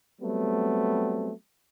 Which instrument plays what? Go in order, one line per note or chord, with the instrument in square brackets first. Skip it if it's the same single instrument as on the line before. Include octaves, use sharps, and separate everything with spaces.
[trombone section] F#3 G3 A3 B3 C4